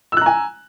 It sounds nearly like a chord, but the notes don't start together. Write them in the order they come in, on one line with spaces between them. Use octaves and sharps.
E6 F#6 A#5 G#5